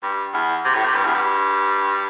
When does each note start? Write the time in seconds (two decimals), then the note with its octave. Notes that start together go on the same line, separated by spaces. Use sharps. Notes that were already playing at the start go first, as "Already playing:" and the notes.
0.03 G2
0.34 E2
0.65 C3
0.75 A2
0.85 C3
0.95 G2
1.05 E2
1.15 G2